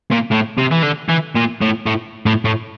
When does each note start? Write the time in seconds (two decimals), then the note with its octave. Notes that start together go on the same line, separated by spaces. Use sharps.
0.12 A#2
0.31 A2
0.58 C3
0.72 E3
0.83 D3
1.09 E3
1.36 A#2
1.62 A2
1.87 A2
2.26 A2
2.45 A2